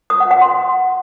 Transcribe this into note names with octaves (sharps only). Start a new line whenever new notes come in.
D#6
F#5
F#5
C6